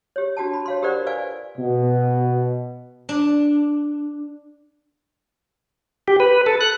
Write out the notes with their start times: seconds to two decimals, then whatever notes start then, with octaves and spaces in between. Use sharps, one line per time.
0.16 G4 C#5
0.37 D4 F#4 G5 A5
0.53 B5
0.66 C#5 F5 C6
0.82 F4 G4 A#4 C5 D5 F#5
1.06 B4 D5 F5 G#5
1.58 B2
3.09 D4
6.08 G4
6.20 B4
6.46 A4
6.61 F#6